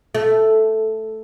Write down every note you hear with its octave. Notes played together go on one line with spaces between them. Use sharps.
A3